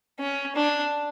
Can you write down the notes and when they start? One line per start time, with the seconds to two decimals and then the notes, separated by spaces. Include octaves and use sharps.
0.20 C#4
0.56 D4